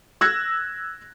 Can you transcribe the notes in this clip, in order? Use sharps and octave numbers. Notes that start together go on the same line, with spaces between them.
E6 F#6 G#6 A#6